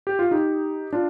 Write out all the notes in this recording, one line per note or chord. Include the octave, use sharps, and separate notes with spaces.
G4
F4
D#4 G4
D4 F4